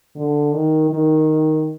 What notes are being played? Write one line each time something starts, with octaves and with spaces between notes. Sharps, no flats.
D3
D#3
D#3